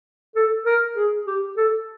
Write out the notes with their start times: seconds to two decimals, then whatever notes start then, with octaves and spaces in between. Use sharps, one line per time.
0.36 A4
0.66 A#4
0.96 G#4
1.27 G4
1.57 A4